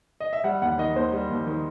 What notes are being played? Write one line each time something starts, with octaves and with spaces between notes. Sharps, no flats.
D#5
E5
G3 F#5
D#2 F#5
D#3 D#5
D#2 C5
G3
D#2
D#3